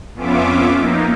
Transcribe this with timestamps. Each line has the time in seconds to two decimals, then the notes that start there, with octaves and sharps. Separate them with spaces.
0.15 F2 B3 C#4 F4 E5 D6
0.76 A#3 D#4